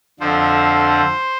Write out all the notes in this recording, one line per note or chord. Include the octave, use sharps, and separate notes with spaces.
F2 D3 F3 C5